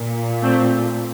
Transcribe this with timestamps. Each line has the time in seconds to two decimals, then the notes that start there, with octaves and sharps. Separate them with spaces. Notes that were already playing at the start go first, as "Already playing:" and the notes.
Already playing: A#2
0.42 A3 C4